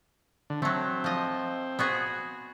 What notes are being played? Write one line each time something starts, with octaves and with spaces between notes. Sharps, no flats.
D3
F#3 A3 C4
F3 D#5
B3 F#4 G#4